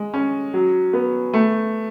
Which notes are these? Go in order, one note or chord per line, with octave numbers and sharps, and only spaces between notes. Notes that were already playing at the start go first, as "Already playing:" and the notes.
Already playing: G#3
C#4
F#3
B3
A3